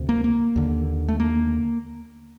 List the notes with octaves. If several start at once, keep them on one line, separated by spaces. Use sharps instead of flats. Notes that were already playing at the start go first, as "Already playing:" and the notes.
Already playing: D2 C3
A#3
A#3
D#2 D3
A3
A#3